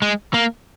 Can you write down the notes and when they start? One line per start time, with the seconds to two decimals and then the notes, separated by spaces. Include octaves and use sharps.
0.02 G#3
0.34 A#3